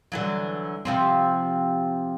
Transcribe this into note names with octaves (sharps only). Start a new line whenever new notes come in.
D3 E3 F#3
C3 F3 C4